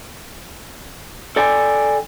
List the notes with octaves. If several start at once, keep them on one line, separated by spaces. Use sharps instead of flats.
A4 D5 G5 G#5